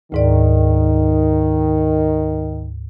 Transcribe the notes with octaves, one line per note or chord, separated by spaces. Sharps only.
D2 G#2 D#3 D5